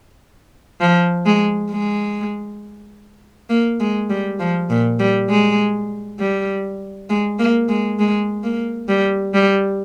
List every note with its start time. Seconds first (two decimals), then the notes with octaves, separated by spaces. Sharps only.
0.80 F3
1.26 G#3
1.71 G#3
3.50 A#3
3.80 G#3
4.10 G3
4.39 F3
4.70 A#2
4.99 G3
5.30 G#3
6.19 G3
7.10 G#3
7.39 A#3
7.68 G#3
7.99 G#3
8.43 A#3
8.88 G3
9.34 G3